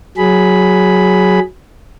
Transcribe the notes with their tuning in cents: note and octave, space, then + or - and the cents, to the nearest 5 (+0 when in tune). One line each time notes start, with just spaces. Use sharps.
F#3 +0 G#4 +5 B5 +0